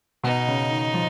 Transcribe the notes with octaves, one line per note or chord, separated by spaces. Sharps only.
B2 D#4
C#3
D#3
F3